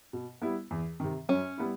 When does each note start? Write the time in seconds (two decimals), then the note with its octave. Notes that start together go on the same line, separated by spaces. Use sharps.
0.13 B2
0.42 G3 B3 E4
0.71 E2
1.00 C3 D#3
1.29 F#2 C#4
1.58 G3 B3 E4